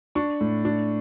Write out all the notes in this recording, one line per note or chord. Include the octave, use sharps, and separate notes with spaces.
D4 C#6
A2
D4